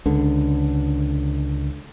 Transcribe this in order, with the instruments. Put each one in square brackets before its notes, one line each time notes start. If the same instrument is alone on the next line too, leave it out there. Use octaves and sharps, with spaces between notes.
[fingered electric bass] C#2 D3